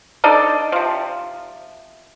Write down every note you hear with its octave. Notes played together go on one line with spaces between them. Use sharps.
D4 D#4 A4 D5
C3 F3